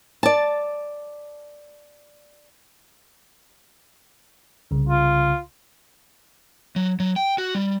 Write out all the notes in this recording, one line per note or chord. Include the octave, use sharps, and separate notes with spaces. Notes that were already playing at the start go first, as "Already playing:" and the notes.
D5 A5
C2 C#3
F4
F#3
F#3
G5
F#4
G3